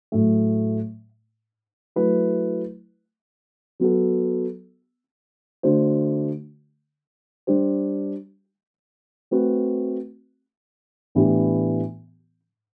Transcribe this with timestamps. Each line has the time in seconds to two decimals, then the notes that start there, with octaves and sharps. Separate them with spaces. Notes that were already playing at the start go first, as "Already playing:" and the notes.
0.12 A2 F#3 A3
1.96 F#3 A3 E4 B4
3.80 F#3 B3 F#4 A4
5.63 D3 A3 D4 F#4 C5
7.47 G3 D4 G4 C5
9.31 A3 C4 F#4 B4
11.15 A2 E3 B3 D4 G4